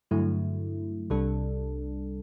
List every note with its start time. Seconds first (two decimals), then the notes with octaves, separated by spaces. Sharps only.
0.11 G2 D3 F#3 A3 E4
1.10 C2 C3 G3 D4 A4